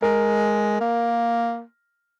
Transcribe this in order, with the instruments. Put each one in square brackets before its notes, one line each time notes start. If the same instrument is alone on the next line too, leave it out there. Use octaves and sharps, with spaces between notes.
[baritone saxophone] G#3 [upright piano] A#4
[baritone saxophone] A#3